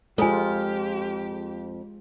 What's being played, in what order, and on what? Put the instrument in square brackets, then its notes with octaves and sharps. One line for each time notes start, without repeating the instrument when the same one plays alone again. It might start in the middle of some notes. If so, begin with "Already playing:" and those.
[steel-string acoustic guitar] F2 [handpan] G#3 F4 [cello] G4 [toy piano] A4 G#5